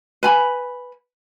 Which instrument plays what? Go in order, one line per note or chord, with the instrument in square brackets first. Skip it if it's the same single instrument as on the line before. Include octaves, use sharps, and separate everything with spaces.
[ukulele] B4 G#5 B5